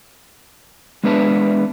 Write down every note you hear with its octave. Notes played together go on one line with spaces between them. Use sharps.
G#3 B3 D4 B4 E5 A5